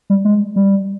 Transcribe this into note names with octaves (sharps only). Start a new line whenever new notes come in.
G3
G#3
G3